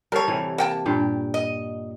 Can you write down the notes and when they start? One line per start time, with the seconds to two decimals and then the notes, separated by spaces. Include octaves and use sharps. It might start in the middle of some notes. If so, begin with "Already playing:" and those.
0.12 G3 A4 A#4 C#5 F5
0.28 C3 E3
0.58 A#3 G5 A5
0.86 G2 A#2 G4
1.34 D#5